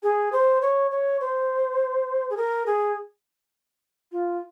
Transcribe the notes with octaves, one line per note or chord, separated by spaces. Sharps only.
G#4
C5
C#5
C#5
C5
G#4
A#4
G#4
F4